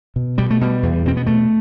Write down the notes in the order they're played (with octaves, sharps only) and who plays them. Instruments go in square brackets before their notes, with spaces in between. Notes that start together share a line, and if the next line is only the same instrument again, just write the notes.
[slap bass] B2
B2 G3
A3
B2 G3
E2
B2 C4
B3
B2 A3